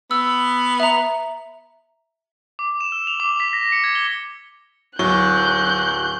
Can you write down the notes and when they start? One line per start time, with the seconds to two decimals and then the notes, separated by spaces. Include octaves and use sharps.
0.11 B3 E6
0.80 E5 A#5
2.59 D6
2.81 E7
2.92 E6
3.07 F7
3.20 D6
3.40 B6
3.53 A#6
3.72 C#7
3.84 G#6
3.95 G7
4.99 D1 F#3 C#6 F#6 G6